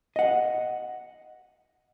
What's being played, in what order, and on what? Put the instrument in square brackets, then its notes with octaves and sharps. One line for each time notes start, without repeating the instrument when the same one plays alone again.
[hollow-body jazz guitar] D#5 F#5